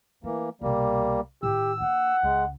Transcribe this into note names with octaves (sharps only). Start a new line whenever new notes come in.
E3 A3 A#3
C2 B2 G3 A#3
A2 D#3 G4 E6
A#3 D4 F#5
C#2 G#3